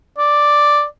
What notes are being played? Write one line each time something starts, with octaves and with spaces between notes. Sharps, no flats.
D5